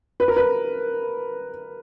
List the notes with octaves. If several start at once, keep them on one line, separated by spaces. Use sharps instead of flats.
B4
A#4
B4